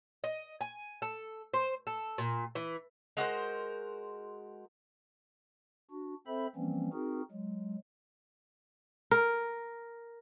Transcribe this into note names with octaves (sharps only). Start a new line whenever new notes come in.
D#5
G#5
A4
C5
A4
A#2
E3
G#3 F#4 A#4 C5
D4 F#4
C4 A4 C5 E5 B5
E3 F3 G3 A#3 C4 C#4
C4 D#4 F#4 G#4 A#4
F#3 G#3
A#4